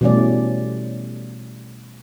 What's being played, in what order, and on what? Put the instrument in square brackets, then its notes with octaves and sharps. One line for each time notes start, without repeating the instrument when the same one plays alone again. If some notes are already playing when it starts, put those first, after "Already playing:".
[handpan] B2 E3 G3 A3 C#4 D5